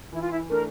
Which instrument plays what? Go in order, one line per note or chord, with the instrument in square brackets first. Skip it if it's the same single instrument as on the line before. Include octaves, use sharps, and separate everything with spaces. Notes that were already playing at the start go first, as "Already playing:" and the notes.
[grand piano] E3 [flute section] E4
[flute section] F4
E4
[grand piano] A3 D4 [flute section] A#4